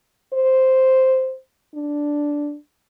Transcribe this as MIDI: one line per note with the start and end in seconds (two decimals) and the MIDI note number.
0.33 1.35 72
1.75 2.55 62